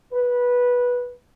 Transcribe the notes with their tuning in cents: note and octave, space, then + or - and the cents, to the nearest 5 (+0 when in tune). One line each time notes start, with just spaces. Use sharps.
B4 -15